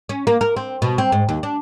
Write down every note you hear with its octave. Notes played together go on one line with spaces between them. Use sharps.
C#4
A#3
A#4
C4
B2
C4
G#2
D#2
D4